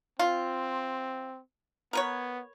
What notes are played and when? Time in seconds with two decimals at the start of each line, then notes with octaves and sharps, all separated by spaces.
0.19 C4 F4
1.93 B3 A#4 B4 C#5